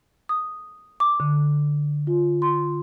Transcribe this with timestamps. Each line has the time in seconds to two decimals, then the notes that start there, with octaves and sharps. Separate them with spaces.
0.29 D#6
1.00 D6
1.20 D3
2.07 F4
2.42 C6